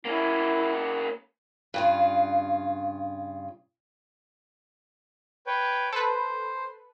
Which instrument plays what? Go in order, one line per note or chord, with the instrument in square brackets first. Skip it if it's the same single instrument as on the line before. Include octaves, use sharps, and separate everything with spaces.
[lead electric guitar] A#3 C#4 [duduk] E4
[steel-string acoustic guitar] G2 C#3 F4
[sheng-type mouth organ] B4 C#5 G5
[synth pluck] A4 B4 [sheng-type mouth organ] C5